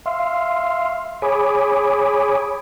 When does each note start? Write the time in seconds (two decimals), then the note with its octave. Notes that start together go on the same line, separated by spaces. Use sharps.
0.06 E5 F5 C6
1.22 G#4 C#5 G#5 B5 D6 D#6